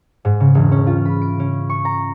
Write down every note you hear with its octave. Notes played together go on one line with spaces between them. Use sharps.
G#2
C#3
E1
C#4
F4
B5
D7
C#4
C#6
A#5